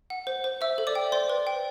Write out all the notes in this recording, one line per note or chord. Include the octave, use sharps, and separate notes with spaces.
F#5
C5
C5
C5 E5 E6
A4
D5 D6
G5
C5 D5 C6
B4
G5